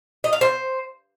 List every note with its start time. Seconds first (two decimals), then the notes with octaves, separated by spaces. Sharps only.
0.24 D#5
0.33 F5
0.41 C5